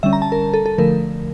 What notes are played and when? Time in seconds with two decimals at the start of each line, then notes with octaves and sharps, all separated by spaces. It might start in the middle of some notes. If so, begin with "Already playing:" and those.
0.03 D3 G3 C#4 E5
0.13 A#5
0.22 A5
0.32 A#4
0.54 A4
0.66 A4
0.78 D3 F3 A3 A#4